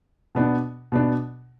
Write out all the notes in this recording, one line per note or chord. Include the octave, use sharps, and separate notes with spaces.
B2 B3 D4
B2 B3 D4